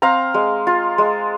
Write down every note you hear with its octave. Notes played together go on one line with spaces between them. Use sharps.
C4 F5 A#5
G#3
F4
G#3